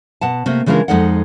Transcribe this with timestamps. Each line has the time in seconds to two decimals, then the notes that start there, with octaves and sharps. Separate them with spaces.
0.21 B2 F#5 A5
0.46 C3 A3 A#3
0.66 C#3 E3 G#3 D4 F4 A#4
0.88 F2 G#3 D#4 A4 D5 F#5